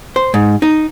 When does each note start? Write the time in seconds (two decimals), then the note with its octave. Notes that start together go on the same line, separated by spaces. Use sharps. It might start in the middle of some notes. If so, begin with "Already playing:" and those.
0.16 C5
0.34 G#2
0.62 D#4